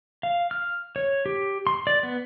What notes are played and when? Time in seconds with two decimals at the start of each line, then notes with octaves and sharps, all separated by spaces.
0.23 F5
0.51 F6
0.96 C#5
1.26 G4
1.67 C6
1.87 D5
2.03 B3